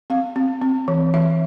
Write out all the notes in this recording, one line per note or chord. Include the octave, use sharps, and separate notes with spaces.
C4 F5
C4
C4
E3
E3 E5